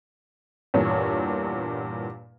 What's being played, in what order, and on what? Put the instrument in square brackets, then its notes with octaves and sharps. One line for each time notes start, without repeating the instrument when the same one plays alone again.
[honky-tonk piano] E2 G2 A#2 C#5